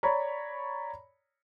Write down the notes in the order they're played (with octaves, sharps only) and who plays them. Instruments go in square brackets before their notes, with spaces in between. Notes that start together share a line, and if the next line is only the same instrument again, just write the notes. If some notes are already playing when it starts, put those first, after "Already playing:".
[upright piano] C#5 D5 A#5 B5